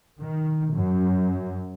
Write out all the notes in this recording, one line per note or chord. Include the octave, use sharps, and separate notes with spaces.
D#3
F#2